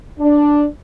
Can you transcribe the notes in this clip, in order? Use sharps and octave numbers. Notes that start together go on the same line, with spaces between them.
D4